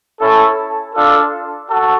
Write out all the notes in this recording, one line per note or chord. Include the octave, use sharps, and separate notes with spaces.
C#4 E4 A4
D4 F4 A4
F#4 A4